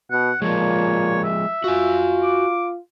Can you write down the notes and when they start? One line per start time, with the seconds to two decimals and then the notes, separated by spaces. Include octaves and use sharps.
0.11 B2 F#5
0.42 A#2 F3 G#3 C#5
1.24 E5
1.64 F4 F#4 G#5
2.22 D6